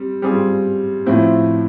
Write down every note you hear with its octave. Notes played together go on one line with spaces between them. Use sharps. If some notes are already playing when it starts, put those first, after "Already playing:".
Already playing: G3 C4
G3 C4 F4 G#4
A2 F3 A3 C4 E4